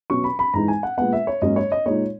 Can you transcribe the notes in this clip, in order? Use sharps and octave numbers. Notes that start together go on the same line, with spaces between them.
B2 F#3 C#4 C#6
B5
B5
G#2 E3 G#3 D#4 A#5
G#5
F#5
A#2 G#3 B3 F#5
E5
C#5
G#2 F#3 A#3 C#4 D#5
C#5
D#5
A#2 G#3 D#4 C#5